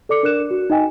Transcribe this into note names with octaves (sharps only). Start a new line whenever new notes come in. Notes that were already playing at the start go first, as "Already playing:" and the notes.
A4 D5 D6 C#7
D4 A#4 D5 F#6 E7
F#4
D#4 D#5 G5 G#5